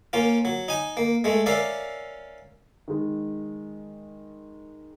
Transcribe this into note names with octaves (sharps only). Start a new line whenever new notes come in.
A#3 C#4 F4
F#3
D#4 G#5
A#3
G#3 A3
C#4 A#4 D5 E5 F5
D#3 G#3